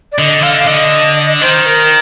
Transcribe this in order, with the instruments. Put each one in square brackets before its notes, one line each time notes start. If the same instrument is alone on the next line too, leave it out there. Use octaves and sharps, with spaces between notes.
[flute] D5
[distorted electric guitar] D3 [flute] D#5
[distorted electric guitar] D3 [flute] F5
[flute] F5
[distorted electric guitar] D3 [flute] D#5
[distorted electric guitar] D#3 [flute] C5
[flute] A#4